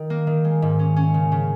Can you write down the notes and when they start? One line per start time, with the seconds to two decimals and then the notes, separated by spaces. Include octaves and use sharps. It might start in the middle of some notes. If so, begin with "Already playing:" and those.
Already playing: D#3
0.10 A#3
0.27 D#3
0.44 G#3
0.62 G#2
0.79 C#4
0.96 C#4
1.14 C#3
1.32 C#3